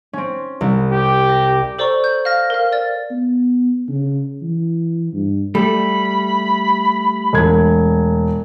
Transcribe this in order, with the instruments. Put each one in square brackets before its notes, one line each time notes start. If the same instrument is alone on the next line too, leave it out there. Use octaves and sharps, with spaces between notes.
[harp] C4 C#4
C2
[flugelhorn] G4
[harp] A#6
[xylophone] A4 C5 D5 A#5 C#6
G6
F5 F6 A#6
A#4 F5
D5 A6
[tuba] B3
C#3
E3
G2
[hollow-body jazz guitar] G3 A3 A4 [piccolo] B5
[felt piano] E1 G#6